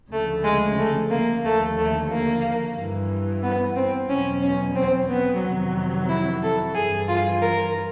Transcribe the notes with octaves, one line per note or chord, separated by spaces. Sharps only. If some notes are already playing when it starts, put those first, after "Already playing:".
D2 C#3 F3 A3
G#3
A3
A#3
D#2 D3 F3 A3
A3
A#3
G2 E3
B3
C4
E2 B2 F#3 C#4
C#4
C4
B3
F2 C3 D#3 F#3
E4
A4
G2 E3 G#4
F4
A#4